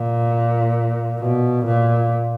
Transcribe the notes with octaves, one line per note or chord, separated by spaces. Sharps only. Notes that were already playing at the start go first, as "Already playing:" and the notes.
Already playing: A#2
B2
A#2